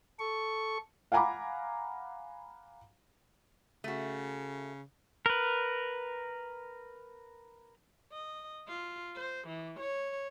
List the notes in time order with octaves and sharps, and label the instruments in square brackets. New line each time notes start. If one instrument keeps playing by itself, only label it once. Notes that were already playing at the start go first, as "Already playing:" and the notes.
[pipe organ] A4 C#6
[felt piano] F5 F#5 G#5 A#5 B5 D6
[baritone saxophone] C#3 [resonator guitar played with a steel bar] A3 F#4
[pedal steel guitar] A#4 B4
[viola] D#5
F4
C5
E3
C#5